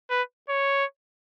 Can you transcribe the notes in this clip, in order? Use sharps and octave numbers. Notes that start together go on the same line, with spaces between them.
B4
C#5